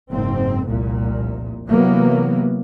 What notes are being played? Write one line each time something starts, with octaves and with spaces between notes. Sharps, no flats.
F#1 G#2 C4
F1 C2 A#2
C3 E3 F#3 A#3 B3